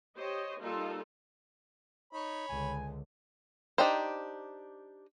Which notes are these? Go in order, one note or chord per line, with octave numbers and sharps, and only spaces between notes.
G4 C5 C#5 D#5
G3 A#3 D#4 F4 A4
D#4 C#5 B5
C#2 D3 G#5
D4 D#4 G4 C5